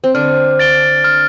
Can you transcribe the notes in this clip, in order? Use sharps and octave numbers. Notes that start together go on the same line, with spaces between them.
C4
D3 D4 F6
A6 D7 G7
F6